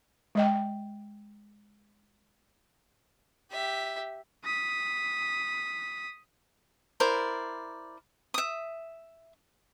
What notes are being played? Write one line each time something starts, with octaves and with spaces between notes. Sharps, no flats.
G#3 D#5 G5
G4 E5
D#6 B6
E4 A#4 C5 D5
E5 D#6